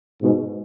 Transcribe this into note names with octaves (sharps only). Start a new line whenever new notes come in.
G#2 B2